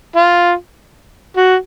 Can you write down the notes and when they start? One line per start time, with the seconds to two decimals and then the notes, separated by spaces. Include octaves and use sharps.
0.16 F4
1.37 F#4